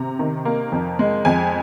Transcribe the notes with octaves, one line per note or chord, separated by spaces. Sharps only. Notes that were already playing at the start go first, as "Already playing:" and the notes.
Already playing: C3 A#5
D#3
A#3
F2
G#3
F2 G#5